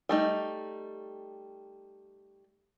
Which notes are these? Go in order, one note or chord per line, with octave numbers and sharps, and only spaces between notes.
G3 A3 D#4